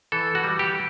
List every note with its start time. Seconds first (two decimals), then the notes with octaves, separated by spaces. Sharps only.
0.12 E3 A4
0.35 F#4
0.44 G3
0.59 G4